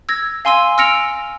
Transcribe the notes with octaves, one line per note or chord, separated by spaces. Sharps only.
E6 G#6 A#6
F5 G#5 C6 E6 D#7
E6 F6 A#6 C#7 D7 F7